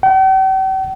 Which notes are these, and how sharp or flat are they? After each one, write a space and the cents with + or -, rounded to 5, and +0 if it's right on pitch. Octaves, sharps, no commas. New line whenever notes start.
G5 -45